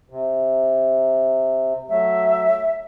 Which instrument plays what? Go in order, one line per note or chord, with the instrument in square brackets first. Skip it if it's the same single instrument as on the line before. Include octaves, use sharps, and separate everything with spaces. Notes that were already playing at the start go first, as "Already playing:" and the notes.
[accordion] C3
[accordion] F#3 A3 [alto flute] E5